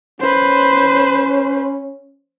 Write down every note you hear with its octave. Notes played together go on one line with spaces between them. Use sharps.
C#4 B4 C5